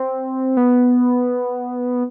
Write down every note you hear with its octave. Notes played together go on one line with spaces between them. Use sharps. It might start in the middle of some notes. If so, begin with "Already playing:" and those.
Already playing: C4
B3